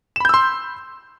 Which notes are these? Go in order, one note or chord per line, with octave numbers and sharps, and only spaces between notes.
B5 C6 E6 G6 E7